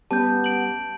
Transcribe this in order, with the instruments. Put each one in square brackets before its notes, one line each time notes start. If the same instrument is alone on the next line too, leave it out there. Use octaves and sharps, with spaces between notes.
[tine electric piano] G3 C#4 G4 [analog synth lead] B3 [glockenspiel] A5 G6
[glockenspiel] D7 F#7